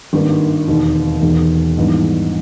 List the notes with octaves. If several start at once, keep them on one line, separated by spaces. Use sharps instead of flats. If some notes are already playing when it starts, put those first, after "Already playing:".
G#1 G2 D#3 A#3
E1 D#2 D#3
E1 E2 D#3
A#1 G#2 E3 G3 B3